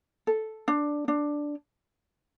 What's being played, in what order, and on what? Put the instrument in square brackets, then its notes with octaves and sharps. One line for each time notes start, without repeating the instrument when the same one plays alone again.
[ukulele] A4
D4
D4